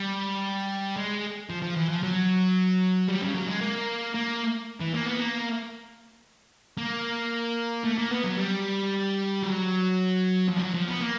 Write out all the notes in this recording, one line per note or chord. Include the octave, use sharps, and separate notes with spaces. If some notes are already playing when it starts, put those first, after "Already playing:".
Already playing: G3
G#3
F3
F3
E3
F3
F#3
G3
C#3
F#3
G#3
A#3
A#3
E3
A#3
B3
A#3
A#3
A3
A#3
B3
F#3
G3
F#3
F3
G3
F#3
F3
B3
A#3